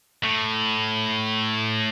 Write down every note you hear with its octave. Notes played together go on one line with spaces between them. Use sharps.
A2